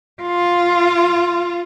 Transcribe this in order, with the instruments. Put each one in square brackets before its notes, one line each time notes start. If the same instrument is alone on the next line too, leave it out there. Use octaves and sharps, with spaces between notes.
[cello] F4